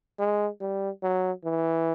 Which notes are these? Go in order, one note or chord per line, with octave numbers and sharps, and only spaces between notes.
G#3
G3
F#3
E3